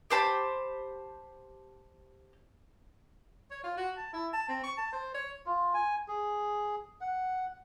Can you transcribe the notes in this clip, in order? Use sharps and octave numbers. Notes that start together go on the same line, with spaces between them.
G4 C5 A5 B5
C#5
F4
F#4
A5
E4
A5
C4
C#6
A5
C5
C#5
F4
G#5
G#4
F#5